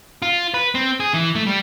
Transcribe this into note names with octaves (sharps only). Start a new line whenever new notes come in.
F4
B4
C4
G#4
E3
A3
G3